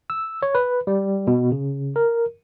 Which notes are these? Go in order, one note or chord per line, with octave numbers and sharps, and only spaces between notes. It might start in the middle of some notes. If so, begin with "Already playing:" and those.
E6
C#5
B4
G3
B2
C#3
A#4